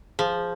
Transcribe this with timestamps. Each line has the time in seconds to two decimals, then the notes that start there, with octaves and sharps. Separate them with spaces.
0.19 F3 G#4